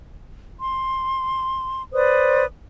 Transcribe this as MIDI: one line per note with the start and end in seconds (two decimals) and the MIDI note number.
0.59 1.82 84
1.93 2.44 71
1.93 2.44 72
1.93 2.44 74
1.93 2.44 87